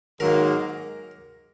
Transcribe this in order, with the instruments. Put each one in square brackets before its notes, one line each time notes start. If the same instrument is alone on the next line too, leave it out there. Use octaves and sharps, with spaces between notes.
[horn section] G#2 D#3 F#3 A#3 [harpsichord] A#4